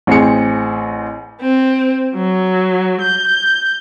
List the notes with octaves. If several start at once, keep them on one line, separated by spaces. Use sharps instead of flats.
A1 C4 G#4 C#7
C4
F#3
G6